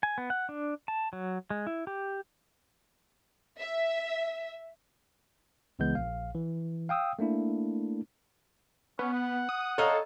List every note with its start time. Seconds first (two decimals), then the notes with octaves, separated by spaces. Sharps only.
0.03 G#5
0.18 B3
0.30 F#5
0.49 D4
0.88 A5
1.13 F#3
1.50 G#3
1.67 E4
1.87 G4
3.60 E5
5.79 C#2 C#3 E3 G#3 B3 G6
5.95 A#1 F5
6.35 E3
6.89 F5 G5 D#6 E6
7.19 A3 A#3 D4 E4
8.99 B3 C#4
9.13 F#5
9.49 D#6
9.78 A4 C#5 D#5 F5 A#5 F6